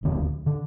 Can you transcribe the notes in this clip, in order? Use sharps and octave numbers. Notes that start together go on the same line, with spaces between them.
E1 D2 D3
D3